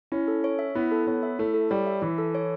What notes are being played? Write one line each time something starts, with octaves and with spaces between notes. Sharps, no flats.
C#4 E4
A4
C#5
E5
B3 E4
A4
B3 C#5
E5
A3 E4
A4
G3 C#5
E5
E3 E4
A4
C#5